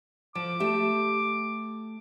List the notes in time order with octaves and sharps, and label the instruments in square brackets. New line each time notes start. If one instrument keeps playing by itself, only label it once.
[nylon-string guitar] F3 [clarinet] D6
[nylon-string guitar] A3 G4 E5